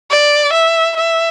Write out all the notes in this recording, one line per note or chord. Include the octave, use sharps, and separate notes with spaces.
D5
E5
E5